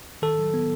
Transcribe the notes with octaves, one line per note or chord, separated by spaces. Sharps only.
D#3 A4
F#3
B3